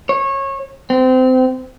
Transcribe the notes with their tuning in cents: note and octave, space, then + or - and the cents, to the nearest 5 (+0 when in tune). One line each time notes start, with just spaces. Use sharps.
C#5 -25
C4 -25